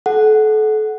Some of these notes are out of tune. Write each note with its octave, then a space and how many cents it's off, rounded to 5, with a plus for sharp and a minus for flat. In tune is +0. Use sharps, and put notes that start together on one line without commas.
A4 -35 F#5 +0